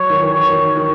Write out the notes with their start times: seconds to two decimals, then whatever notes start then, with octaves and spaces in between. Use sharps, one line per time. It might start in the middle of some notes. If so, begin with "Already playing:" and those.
Already playing: F#3 C#5
0.10 D#3
0.20 E3
0.35 C#5
0.49 D#3
0.77 D#3